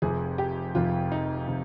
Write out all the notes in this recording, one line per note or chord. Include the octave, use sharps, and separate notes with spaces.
F1 F2 C3 G#4
G4
F1 F2 C3 F4
D#4
C3